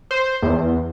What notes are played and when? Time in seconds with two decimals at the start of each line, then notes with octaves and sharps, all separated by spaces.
0.11 C5
0.42 E2